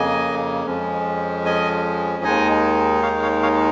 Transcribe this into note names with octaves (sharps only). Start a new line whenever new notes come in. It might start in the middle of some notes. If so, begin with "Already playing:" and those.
Already playing: F2 C#3 A#3 D#5 G#5
F2 F3 G#3 C#4
D#5 G#5
D#2 D#3 G#3 D#4 D#5 G#5
C#5 F5
C#5 F5
C#5 F5